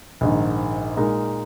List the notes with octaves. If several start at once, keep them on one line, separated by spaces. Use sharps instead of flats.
A#1 G#2 D#3
A#2 G#3 D#4 A#4